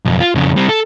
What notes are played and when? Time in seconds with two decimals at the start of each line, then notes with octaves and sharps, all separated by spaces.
0.05 B1 F2
0.20 F4
0.35 F2 C#3
0.56 G3 C4
0.69 A4